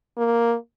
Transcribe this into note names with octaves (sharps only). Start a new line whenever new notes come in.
A#3